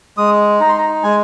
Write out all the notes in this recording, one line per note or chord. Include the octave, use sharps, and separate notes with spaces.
G#3 D#6
D#4 A#5
C6
A#5
G#3 G#5